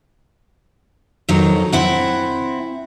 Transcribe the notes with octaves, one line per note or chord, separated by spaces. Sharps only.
F2 D#3 F#3 D#4
C4 E4 F#5